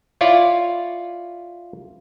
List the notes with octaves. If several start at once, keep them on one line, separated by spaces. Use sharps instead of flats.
E4 F4 C#5 D5